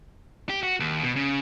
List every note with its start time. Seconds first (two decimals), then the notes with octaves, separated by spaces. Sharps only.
0.49 G4
0.63 F#4
0.80 D#2
1.03 B2
1.16 C#3